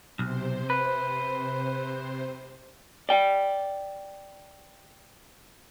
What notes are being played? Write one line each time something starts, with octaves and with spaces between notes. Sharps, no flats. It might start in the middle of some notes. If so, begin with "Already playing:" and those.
B1 C3 C5
B4
D5 G5